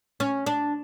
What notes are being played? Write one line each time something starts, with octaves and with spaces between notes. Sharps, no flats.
C#4
D4